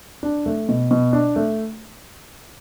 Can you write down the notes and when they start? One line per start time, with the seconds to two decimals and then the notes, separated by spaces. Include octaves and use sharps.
0.23 D4
0.46 A3
0.69 B2
0.91 B2
1.13 D4
1.36 A3